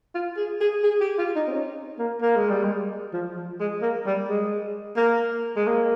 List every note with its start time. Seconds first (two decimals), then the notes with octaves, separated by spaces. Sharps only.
0.15 F4
0.37 G#4
0.60 G#4
0.84 G#4
1.01 G4
1.18 F4
1.36 D#4
1.47 C4
1.53 C#4
1.99 A#3
2.22 A#3
2.36 G#3
2.50 G3
2.63 G#3
3.13 F3
3.36 F3
3.60 G#3
3.82 A#3
4.06 G3
4.29 G#3
4.97 A#3
5.56 G#3
5.67 A#3